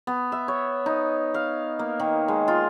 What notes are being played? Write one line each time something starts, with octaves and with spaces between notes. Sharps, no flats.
B3
E5
C#5
D#4
F5
A#3
D#3
G#3
F4